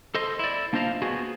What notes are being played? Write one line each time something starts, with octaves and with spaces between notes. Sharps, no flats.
A4 C5 D#5 C6
E4 D5
A#3 D4 F4 C5 D#5 F5
B3 F#4 G#4